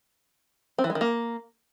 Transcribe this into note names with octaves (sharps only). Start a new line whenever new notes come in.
C4
E3
G#3
D#3
A#3